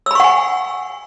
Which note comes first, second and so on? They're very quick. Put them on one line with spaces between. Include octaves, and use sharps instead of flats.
E6 B5 C#6 F#5 G#5